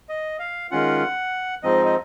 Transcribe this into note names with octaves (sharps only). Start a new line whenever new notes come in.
D#5
F5
D#3 G#3 C#4 F4 F#5
G#2 F3 C4 D#4 D#5
D#5